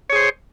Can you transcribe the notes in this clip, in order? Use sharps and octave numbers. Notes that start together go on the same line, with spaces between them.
G#4 C5 C#5